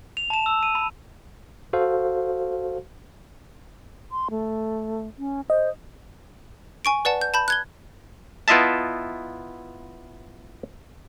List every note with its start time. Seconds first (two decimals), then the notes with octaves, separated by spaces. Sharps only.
0.17 F7
0.30 A5 E7
0.46 E6
0.63 D#7
0.75 B5
1.73 F#4 A4 C5 F5
4.12 C6
4.30 A3
5.18 C#4
5.50 C5 D#5
6.85 G#5 C#6 D7
7.05 B4 D5 F#5 A5
7.21 G6
7.34 A5 B5 G6
7.48 F#6 G#6 G7
8.48 B3 E4 F4 D#5 E5 A5